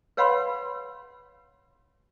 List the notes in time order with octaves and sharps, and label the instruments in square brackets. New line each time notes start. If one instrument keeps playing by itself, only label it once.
[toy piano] B4 C#5 F5 F#5 B5 C6